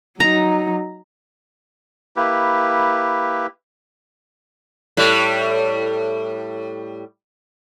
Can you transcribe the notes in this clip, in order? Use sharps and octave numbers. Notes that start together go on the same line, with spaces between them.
F#3 D#4 A#5
A#3 E4 G4 B4
A2 G3